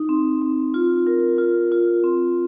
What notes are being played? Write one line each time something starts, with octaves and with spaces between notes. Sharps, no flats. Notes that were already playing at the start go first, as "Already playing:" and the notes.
Already playing: D#4
C4
C4
F4
A#4
F4
F4
C4